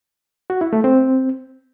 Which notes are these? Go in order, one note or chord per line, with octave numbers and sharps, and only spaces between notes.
F#4
E4
A3
C4